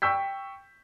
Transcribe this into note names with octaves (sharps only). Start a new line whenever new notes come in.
G5 C#6 E6 G6 B6